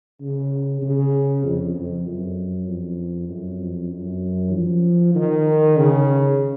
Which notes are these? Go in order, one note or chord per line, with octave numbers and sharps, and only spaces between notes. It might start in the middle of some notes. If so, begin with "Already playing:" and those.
C#3
C#3
F2
F2
F#2
F2
F#2
F2
F#2
F3
D#3
C#3